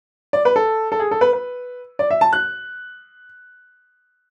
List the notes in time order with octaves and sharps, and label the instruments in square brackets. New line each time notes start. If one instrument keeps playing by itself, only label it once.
[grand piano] D5
B4
A4
A4
G#4
A4
B4
B4
D5
E5
A5
F#6